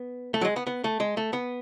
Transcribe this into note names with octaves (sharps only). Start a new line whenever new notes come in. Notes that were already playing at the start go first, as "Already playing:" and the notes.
Already playing: B3
A3
F#3
G#3
B3
B3
A3
G#3
A3
B3